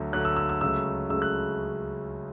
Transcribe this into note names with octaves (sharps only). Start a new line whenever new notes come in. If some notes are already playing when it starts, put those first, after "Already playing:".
Already playing: D2 D3 F#3
D2 D3 F#3 F#6
E6
E6
E6
C#2 C#3 F#3 A3 E6
C#2 C#3 F#3 A3 E6
F#6